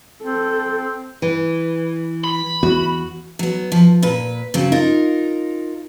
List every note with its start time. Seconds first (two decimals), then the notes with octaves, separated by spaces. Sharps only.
0.23 C4 A4
1.22 E3
2.24 B5
2.63 E2 F#4
3.39 F#3 B3
3.72 F3
4.02 A#2 B4
4.54 C#3 F#3 C4
4.72 D#4 F4 A#4